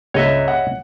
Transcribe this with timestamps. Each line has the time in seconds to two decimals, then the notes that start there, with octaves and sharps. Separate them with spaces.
0.14 C#2 G2 C#5 D#5 E5
0.48 F#5